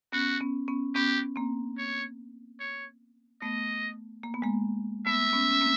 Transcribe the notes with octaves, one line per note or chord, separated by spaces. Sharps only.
B3 C#4 F#4
B3 C#4
B3 C#4
B3 C#4 G4
A#3 C4
C#5
C#5
A3 B3 D#5
A#3
B3
G#3 A#3
A3 B3 E5
B3 C#4
C#4
A#3 C4